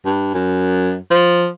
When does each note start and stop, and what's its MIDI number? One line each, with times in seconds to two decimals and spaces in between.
0.05 0.31 43
0.34 0.95 42
1.11 1.48 53